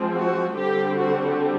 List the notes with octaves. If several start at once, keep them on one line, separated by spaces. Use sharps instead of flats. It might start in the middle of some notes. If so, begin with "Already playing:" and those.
Already playing: F3 G#3 C4
F#4
D3 G3 C4 G4
F#4